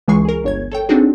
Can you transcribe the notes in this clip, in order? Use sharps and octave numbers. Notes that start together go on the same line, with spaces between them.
C#2 E3 G#3 G#5 C#6 C7
G#4 A#4
G1 C#5 G#6
A4 C#5 G5
C4 D4 D#4 F#4 G#4